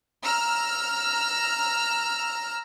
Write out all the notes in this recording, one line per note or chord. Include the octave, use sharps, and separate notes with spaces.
A#5 E6 F6